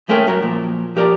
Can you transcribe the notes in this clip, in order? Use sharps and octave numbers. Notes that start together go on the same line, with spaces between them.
D#2 G#3 A3 C#4 A#4 G5
F#2 F#3 A#4 A#5
A#2 F3
F3 G4 A#4 C#5 D5 A#5